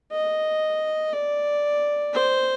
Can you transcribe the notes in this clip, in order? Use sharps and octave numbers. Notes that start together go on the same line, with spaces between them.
D#5
D5
C5